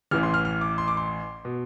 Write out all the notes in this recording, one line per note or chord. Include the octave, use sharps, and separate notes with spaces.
A1 A2 E3 F6
C6
F6
F6
D6
C6
D6
C6
B2